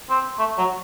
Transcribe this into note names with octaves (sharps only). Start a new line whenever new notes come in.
C4
A3
F#3